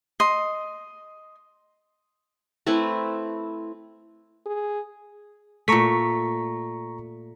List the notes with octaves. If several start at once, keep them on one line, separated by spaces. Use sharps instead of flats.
D#5 C6
A3 C4 E4 B4
G#4
A#2 A3 A#5 C#6 B6